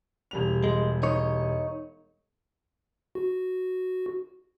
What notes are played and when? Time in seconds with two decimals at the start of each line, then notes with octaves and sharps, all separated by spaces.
0.31 E1 G3 F7
0.64 G#3
1.03 D#4 C#5
3.15 F#4